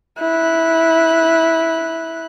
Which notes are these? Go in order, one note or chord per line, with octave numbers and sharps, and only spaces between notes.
E4 F#6